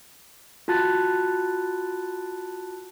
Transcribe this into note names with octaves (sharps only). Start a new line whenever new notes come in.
F4 F#4 A5 F#6 A6